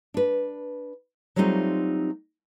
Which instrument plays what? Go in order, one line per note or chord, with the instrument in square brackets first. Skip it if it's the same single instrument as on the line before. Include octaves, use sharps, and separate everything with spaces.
[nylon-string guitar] D4 B4
F#3 G3 A3 C4 D#4 F4